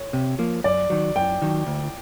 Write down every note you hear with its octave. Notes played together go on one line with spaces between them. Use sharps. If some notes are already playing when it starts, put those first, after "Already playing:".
Already playing: C#5
C3
F3 A#3
F#2 D5
D#3 F#3
F#2 G5
D#3 F#3
D2